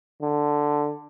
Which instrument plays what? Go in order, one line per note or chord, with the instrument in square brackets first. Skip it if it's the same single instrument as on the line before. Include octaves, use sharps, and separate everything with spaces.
[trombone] D3